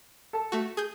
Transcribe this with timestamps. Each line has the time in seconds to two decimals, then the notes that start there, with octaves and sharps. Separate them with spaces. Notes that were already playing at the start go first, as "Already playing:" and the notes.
0.33 A4 A5
0.52 A3 F#4
0.77 G#4 G6